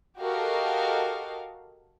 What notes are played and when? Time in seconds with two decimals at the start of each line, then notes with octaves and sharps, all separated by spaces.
0.18 F#4 G4 A4 A#4 D#5 F5